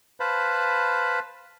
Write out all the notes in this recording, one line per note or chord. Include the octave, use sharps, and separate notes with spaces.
B4 C5 F5 A5 B5